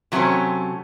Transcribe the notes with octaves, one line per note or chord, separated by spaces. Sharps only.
C3 F#3 A3 C4 C#4